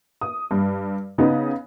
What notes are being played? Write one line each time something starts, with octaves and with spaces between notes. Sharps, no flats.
D#6
G2
C#3 B3 D#4